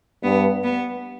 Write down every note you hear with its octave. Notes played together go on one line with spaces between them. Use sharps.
G2 B3
B3